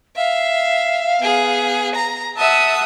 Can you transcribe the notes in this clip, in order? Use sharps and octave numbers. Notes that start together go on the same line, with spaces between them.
E5 F5
B3 G#4
A#5
E5 F#5 A5 D#6